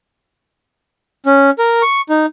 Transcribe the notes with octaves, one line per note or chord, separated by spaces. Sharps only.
C#4
A#4
C#6
D#4